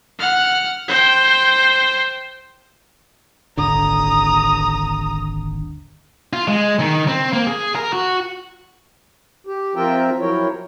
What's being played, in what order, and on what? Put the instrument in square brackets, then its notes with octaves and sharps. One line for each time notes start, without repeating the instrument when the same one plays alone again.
[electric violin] F#5 F6
C5 G5
[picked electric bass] D#1 G#1 D3 [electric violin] A#5 D#6
[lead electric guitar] F4
G#3
D#3
C4
A#3
G#4
A#4
F#4
[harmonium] G4
F3 C4 F4 A#4 E5 G5
F3 F#3 E4 A#4 C#5 G5